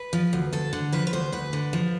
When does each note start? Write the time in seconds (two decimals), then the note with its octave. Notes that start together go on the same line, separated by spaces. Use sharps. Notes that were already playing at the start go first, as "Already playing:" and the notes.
Already playing: B4
0.13 F3
0.33 D2
0.53 D2 A4
0.73 D3
0.93 F3 B4
1.07 B4
1.13 D2 C5
1.32 D2 B4
1.53 D3
1.73 F3